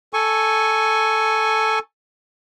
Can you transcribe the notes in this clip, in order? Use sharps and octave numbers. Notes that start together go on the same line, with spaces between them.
A4 G#5 C#6